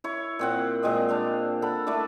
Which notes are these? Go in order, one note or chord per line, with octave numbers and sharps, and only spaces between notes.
E4 C#5
A#2 C4 F#5
A#2 G#3 C4 D#5
D4 C5 F5
A4 F#5 B5
A3 E4 D5 E5